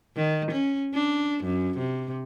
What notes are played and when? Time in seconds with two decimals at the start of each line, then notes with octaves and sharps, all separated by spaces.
0.17 D#3
0.51 C#4
0.95 D4
1.44 F#2
1.78 C3